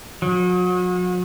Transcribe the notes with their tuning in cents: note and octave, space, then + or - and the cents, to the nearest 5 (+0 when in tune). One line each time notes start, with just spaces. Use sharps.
F#3 -40